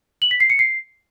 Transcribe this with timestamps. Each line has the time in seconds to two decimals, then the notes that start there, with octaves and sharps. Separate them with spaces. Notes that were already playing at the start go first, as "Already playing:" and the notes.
0.22 F#7
0.31 B6
0.40 C7
0.50 C#7
0.59 C7